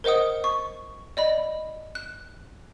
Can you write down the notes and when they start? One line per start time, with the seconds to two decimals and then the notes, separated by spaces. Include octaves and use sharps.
0.04 A#4 C5 D#5 F#5 D#6
0.44 C#6
1.17 D5 D#5 B5
1.95 F#6